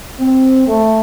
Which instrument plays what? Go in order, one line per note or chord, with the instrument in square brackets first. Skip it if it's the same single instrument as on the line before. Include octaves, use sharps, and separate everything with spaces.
[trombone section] C4
A3